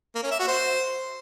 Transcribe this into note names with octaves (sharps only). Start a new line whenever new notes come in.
A#3
C#4
E5
F#4
C5